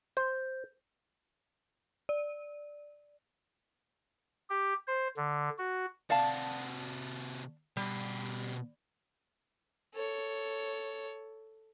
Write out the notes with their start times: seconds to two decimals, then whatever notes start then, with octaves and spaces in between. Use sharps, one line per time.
0.17 C5 G6
2.09 D5
4.50 G4
4.87 C5
5.17 D3
5.58 F#4
6.10 C3 F#4 D5 F5 A5
7.77 B2 G3 G4
9.94 A4 C#5